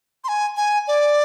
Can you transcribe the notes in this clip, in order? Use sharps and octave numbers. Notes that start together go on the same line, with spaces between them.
C6
G#5
G#5
D5